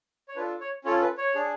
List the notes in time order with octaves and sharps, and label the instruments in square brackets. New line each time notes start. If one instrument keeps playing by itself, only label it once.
[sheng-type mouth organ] C#5
D4 F4 A4 B4
C#5
C#4 F4 A4 C#5
B4
C#5
D4 G#4